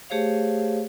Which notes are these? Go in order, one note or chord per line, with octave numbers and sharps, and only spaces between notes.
A3 G4 G#4 C5 C#5 F5